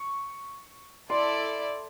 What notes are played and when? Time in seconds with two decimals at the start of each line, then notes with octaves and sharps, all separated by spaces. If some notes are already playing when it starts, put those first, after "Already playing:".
Already playing: C#6
1.09 E4 A4 D5 C6